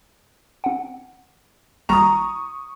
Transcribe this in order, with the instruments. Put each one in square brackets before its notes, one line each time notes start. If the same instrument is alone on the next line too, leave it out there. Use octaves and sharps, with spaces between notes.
[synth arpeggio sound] C4 F#5
[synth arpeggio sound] G#1 G3 [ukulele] A#5 [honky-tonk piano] C#6 D#6